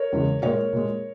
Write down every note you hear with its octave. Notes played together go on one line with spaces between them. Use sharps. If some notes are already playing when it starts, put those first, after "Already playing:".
Already playing: A#4 C#5
E2 C#3 G#3
A#2 G#3 A#4 C#5
A#2 G#3